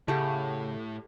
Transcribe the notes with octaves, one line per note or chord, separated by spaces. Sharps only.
A2 C#3 A3 G4 F#5